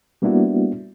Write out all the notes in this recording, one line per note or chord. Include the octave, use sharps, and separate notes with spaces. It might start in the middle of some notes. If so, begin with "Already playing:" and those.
G3 A#3 B3 D4 E4 F#4